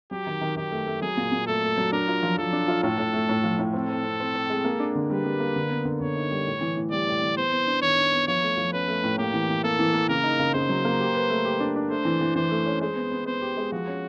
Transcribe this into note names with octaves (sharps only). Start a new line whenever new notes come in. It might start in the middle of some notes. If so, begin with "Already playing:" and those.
F#3 G4
D#3
D#3
D#3 G4
A3
A3
F#3 G#4
A#2
A#2
A3 A4
A3
F#3
D4 A#4
F4
F3
F3 A4
D4
F4
A2 A4
A2
A3
A2
F3
A2
C4 A4
C4
C4
C4
C4
G#3
A#3
D4
D3
G3 B4
G3
A#3
D3
B3
D3
D3 C#5
D#4
G3
A2
E3
A2
G3 D5
A2
E3
B3 C5
B3
D4
D#3 C#5
D4
B3
F3 C#5
A3
F3
C#4 B4
A3
A2
A#3 G4
E3
E3
A#3 A4
E3
A#3
C#3 A#4
D#4
C#3
C#3 C5
F#3
A#3
G4
B4
A3
G4
D4
D4
A3 C5
E3
E3
E3 C5
A3
C#4
G#3 C5
B3
B3
B3 C5
G4
G#3
F3 F#4
C#4